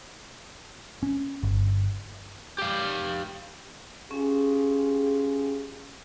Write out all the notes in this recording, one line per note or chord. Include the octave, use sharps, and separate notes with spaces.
C#4
G1
G4 F5
C#4 F4 G4 G#4